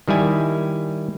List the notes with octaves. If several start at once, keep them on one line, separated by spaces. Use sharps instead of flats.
D#3 G3 E4 G#5